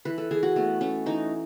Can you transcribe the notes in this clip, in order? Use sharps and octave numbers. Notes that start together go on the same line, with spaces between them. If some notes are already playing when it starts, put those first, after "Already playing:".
E3 B4
A4
E3 G#4
F#4
A3 B3
A3 C#4
E3 D#4